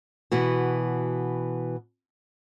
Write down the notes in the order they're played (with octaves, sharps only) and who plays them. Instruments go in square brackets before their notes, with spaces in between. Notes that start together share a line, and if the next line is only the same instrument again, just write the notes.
[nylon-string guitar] B2 E3 F#4